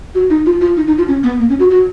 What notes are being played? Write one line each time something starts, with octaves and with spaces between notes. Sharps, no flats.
F#4
D#4
F4
F4
D#4
D#4
F4
C#4
B3
A#3
C#4
F#4
F#4